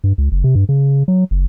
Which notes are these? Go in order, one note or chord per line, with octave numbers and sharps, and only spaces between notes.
G2
C#2
F#1
C3
G2
C#3
F#3
F#1